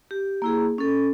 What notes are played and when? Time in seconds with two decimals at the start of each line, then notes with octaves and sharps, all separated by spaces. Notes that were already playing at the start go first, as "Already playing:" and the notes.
0.11 G4
0.42 A#3 E4 G#4
0.78 C#4 A4